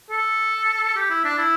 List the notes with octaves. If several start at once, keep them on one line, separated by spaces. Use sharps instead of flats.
A4
G4
E4
D4
E4